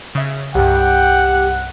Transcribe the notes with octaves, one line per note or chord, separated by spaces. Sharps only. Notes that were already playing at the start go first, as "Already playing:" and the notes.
C#3 E5
C2 G2 G4 F#5 G5